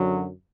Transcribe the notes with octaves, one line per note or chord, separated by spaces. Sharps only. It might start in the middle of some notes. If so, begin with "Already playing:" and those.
Already playing: F#2 D3 F#3